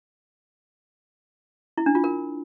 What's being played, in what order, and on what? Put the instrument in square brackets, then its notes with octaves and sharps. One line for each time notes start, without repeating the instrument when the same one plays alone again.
[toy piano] E4
D4
F4
A#4